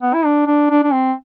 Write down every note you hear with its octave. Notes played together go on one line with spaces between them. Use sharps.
B3
E4
D4
D4
D4
D4
C4